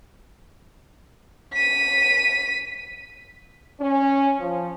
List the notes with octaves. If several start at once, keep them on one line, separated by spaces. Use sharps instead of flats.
B6 D#7
C#4
F3